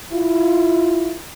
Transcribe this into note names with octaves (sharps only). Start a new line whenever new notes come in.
E4 F4